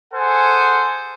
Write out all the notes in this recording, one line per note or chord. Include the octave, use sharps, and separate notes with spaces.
G#4 A4 C5 F#5 G#5